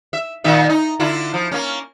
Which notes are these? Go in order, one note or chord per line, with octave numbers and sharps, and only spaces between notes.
E5
A#2 D#3 E5
D#4
D3 E4 F4
F3
A#3 C#4